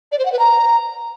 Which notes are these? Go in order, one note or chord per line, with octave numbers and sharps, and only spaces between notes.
D5
C5
F#5
B4
A#5